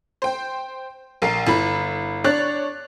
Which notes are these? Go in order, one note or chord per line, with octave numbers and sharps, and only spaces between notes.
C5 G5
A#1 A#4 C7
G1 E4 B5
D4 C#5 F#6 A6